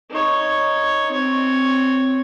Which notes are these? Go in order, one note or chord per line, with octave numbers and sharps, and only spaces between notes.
D#4 C#5
C4 C#5